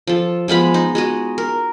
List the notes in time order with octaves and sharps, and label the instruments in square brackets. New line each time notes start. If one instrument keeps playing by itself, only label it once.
[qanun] F3 A4
F3 G#3 B3 B5
D#4
G#3 F#4 D#5
A#4